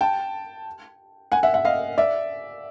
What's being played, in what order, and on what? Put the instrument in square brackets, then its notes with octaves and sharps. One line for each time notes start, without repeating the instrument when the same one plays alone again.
[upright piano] G5 A5
F#5 G#5
E5 F#5
E5 F#5
D#5 F5
D5 E5